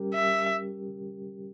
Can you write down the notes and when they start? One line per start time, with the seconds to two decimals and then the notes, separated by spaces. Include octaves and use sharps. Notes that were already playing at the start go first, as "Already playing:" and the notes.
Already playing: G3 C#4 G4 A#4
0.14 E5